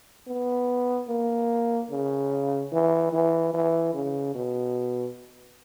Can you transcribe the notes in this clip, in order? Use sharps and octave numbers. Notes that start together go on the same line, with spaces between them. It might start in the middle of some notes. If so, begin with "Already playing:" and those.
B3
A#3
C#3
E3
E3
E3
C#3
B2